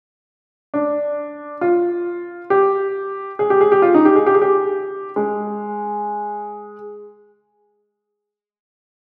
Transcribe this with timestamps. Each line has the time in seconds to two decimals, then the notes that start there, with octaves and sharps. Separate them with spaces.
0.74 D4
1.61 F4
2.50 G4
3.39 G#4
3.50 G4
3.61 G#4
3.72 G4
3.82 F4
3.94 D#4
4.05 G4
4.16 G#4
4.26 G4
4.34 G#4
4.42 G4
5.16 G#3